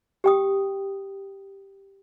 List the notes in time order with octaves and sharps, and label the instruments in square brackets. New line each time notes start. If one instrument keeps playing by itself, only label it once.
[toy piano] G4 G5 D#6